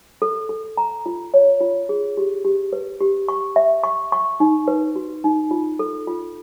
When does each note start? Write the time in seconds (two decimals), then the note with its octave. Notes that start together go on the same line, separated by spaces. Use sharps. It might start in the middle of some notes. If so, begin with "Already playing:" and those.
0.22 A4
0.49 A4
0.77 A#5
1.06 F4
1.34 C#5
1.60 F4
1.89 G#4
2.17 G4
2.45 G4
2.73 B4
3.01 G4
3.29 C#6
3.56 E5
3.84 C#6
4.12 C#6
4.40 D#4
4.68 B4
4.96 F#4
5.24 D#4
5.51 F4
5.79 A4
6.07 F4